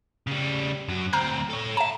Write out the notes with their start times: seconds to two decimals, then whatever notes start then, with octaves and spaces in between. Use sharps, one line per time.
0.27 C#3 G3
0.88 F#2 F#3
1.13 D2 C4 A#5 F6 G6
1.50 A4 C#5
1.77 E5 A5 A#5